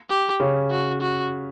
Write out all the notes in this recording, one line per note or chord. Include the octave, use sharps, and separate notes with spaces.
G4
C#3 C#4
F#4
F#4